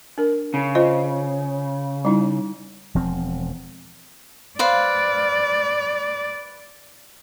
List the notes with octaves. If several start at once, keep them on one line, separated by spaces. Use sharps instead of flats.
D4 A#4
C#3
F4 C5 D#5
G3 D#4 E4
E1 F3 C4
B4 C5 D5 F5